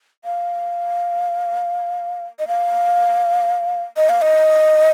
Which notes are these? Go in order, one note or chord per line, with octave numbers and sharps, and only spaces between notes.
F5
D#5
F5
D#5
F5
D#5